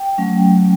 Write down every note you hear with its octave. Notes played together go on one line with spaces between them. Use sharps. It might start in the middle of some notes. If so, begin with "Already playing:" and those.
Already playing: G5
F#3 A3 C#4